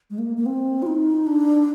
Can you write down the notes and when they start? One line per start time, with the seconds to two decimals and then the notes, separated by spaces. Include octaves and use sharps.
0.11 G#3
0.18 A#3
0.37 A#3
0.46 C4
0.82 F4
0.86 D#4
1.27 D4